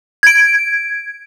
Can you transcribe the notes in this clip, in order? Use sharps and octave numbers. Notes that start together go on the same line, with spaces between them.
G#6 D7